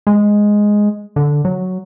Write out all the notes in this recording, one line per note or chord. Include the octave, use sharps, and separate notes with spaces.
G#3
D3
F#3